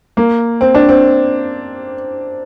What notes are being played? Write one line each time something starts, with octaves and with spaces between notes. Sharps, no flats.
A#3
C4
D4
C4